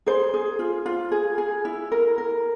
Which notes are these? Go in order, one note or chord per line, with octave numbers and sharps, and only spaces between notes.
G#4 C5
G#4
F4
F4
G#4
G#4
E4
A#4
A#4